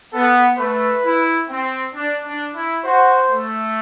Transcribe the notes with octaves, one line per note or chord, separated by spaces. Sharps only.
B3 A4
A3 B4
E4
C4
D4
D4
E4
F#4 C5
A3